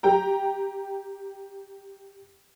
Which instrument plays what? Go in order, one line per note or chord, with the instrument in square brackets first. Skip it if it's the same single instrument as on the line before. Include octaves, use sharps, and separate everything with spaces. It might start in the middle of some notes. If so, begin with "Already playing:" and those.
[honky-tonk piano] G4 G5 A#5